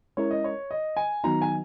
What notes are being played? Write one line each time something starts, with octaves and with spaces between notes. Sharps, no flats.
G#3 C#4 E4 A#4 C#5
D#5
C#5
D#5
G#5
D#3 F#3 B3 D#4 F#4 A#5
G#5